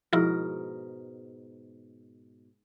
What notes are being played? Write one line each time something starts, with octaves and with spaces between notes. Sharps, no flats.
G#2 B2 F3 E4 A#4